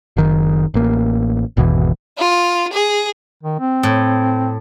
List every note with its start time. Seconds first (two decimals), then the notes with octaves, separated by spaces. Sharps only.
0.17 F#1 D#3
0.74 A1 A#3
1.57 G#1 E2 B2 E3
2.19 F4
2.73 G#4
3.43 D#3
3.60 C4
3.83 A2